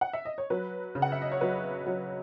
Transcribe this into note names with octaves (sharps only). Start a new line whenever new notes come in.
F#5
E5
D#5
C#5
F#3 B4
C#3
F#5
E5
D#5
C#5
F#3 B4
F#3